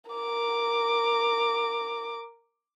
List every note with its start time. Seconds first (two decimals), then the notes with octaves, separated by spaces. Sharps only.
0.11 A#4 D6